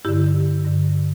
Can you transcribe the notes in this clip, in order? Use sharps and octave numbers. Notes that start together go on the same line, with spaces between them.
G2 D3 E4 G4
G2 D3